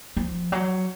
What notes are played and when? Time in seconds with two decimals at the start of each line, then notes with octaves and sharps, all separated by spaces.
0.17 F3
0.52 F#3